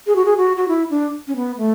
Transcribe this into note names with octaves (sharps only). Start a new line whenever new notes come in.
G#4
F#4
G#4
F#4
F#4
E4
D4
C#4
B3
A3